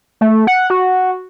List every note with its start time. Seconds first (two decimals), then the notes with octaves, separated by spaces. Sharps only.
0.21 A3
0.47 F#5
0.70 F#4